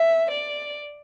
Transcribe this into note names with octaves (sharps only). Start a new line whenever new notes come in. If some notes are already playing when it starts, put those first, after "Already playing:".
Already playing: E5
D5